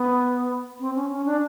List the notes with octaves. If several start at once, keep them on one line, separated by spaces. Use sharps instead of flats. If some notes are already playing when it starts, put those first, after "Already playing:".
Already playing: B3
C4
C#4
C#4
D4